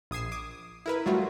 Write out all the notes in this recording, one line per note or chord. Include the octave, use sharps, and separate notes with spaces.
A#1 D#6 G#6 C7 E7
D6 D#6
E4 A#4 B4
F#3 G3 A3 F4 F#4